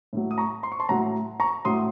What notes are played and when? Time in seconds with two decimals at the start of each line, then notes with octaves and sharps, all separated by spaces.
0.13 A2 F#3
0.31 D#6
0.38 A#5 C#6
0.63 C6
0.72 C#6
0.80 A5 C6
0.89 A2 F#3 F#5 A#5
1.40 A#5 C#6
1.65 A2 F#3 C6 D#6